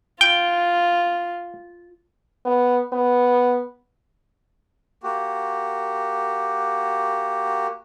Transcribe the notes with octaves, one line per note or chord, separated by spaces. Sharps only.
F4 G5
B3
B3
A#3 F#4 G4